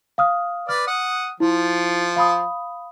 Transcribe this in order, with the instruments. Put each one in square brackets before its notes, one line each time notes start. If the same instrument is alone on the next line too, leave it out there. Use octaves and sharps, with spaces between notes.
[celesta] F5 D#6 F6
[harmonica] B4 D5 [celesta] F6
[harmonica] F#5 D#6
[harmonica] F3 [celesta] E4
[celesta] F5 B5 D#6